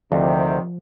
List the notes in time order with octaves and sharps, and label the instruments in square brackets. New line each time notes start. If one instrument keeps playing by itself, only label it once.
[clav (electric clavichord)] D2 [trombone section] C3 D#3 [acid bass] F3